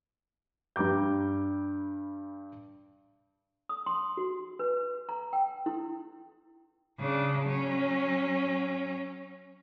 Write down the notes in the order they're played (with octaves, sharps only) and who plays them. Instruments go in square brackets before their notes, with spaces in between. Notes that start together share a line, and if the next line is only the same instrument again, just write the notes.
[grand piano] G2 G3 A#5 D6 G6
[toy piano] D#6
C6
F#4
B4
A#5
G5
E4
[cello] C#3 D4
F#3 C#4